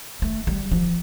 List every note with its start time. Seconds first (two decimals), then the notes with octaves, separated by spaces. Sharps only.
0.22 A3
0.47 G3
0.71 F3